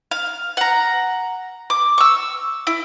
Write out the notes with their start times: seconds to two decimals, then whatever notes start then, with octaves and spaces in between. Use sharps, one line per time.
0.11 F5
0.57 F#5 A#5
1.70 D6
1.98 C#6 E6
2.67 E4